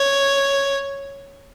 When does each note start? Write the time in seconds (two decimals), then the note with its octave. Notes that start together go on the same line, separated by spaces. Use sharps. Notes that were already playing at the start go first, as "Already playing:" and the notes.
Already playing: C#5